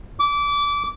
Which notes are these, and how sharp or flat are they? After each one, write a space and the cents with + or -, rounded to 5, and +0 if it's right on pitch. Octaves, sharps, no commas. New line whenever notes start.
D6 -25